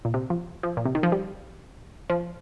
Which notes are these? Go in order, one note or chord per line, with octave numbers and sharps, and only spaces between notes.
A#2
C3
F3
F3
A#2
C3
D#3
F3
G3
F3